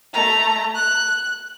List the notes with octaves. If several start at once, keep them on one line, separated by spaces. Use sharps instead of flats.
A3 A#5
F#6